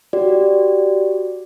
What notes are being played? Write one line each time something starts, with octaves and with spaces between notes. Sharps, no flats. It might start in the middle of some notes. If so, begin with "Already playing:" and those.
F#4 G4 D5